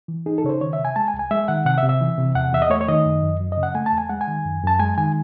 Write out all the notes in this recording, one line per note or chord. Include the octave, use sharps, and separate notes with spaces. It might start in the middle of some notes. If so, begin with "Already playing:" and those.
E3
D#4 G#4
A4
C#3 C#5
C5
D#3 C#5
E5
C3
G#5
G#3 A5
G#5
C2
G#5
G#3 E5
D#3 F#5
C3 F#5
E5
C3
E5
E3
C3
E2 F#5
E2 E5
D#5
A3 C#5
C#5
D#3 D#5
F#2
F#2
F#3
D#5
C#3
F#5
A3 G#5
A5
E2
G#5
G#3 F#5
G#5
D#3
F#2
F#2 A5
G#3 G#5
D#3 G#5